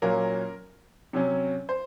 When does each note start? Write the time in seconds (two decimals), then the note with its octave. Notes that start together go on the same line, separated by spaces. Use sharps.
0.02 A#2 F#3 A#3 C#4 A#4
1.13 C3 F#3 C#4
1.69 C5